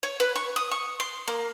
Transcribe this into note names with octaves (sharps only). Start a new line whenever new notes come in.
C#5
B4
C#6
D#6
C#6
C6
A#3